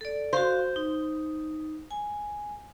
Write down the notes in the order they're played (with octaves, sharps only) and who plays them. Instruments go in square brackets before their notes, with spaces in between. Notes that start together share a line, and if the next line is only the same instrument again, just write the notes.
[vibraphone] A4 D5
[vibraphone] F#4 F5 [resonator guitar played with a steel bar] C5
[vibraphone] D#4
G#5